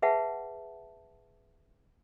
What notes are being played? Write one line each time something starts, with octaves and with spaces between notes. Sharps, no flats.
G#4 B4 E5 F#5 G5 A5